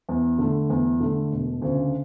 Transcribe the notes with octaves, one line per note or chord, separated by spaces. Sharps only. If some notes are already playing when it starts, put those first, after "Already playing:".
E2
D3 A3
E2
D3 A3
E1
D2 C#3